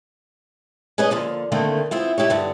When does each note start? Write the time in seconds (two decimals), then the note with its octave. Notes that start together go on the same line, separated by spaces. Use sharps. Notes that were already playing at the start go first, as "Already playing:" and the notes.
0.98 C#4 G#4 B4 C#5 D#5
1.11 D3 F3 A#3
1.52 D3 D#3 A3 A#3 C4
1.91 B3 C4 E4 F4
2.18 D#4 E4 G4 C#5
2.30 G2 D3 B3